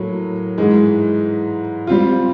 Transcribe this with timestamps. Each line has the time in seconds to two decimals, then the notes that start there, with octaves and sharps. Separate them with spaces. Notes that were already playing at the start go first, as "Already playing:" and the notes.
Already playing: A2 F#3 A#3
0.58 G#2 E3 G#3
1.87 G3 C4 F4